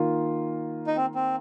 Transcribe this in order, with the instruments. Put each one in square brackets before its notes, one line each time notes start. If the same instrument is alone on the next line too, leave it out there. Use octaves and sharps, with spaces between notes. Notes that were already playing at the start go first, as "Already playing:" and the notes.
Already playing: [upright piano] D#3 A#3 F4
[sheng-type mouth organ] D#4
C4
C4